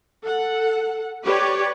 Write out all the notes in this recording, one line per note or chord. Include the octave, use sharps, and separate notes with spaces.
A4 F#5
G4 B4 C#5 D5